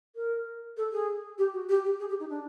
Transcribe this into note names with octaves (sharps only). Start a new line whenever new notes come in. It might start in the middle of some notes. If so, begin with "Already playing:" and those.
A#4
A4
G#4
G4
F#4
G4
G4
G#4
G4
D#4
D4